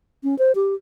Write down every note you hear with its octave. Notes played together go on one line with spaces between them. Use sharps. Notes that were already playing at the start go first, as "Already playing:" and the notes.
C#4
C5
G4